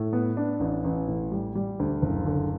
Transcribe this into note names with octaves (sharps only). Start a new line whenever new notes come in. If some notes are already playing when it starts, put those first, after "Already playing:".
Already playing: A2
B3
D4
A1
A1
A2
G3
G3
D2
F#1
D3